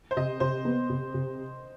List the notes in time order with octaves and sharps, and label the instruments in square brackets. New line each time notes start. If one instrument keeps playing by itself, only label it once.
[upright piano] C5
[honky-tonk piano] C3 [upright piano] D#5
[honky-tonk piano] C3 [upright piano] C5
[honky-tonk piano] B3
C3
C3